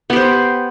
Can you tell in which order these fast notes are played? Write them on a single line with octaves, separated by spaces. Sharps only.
B3 G4 C5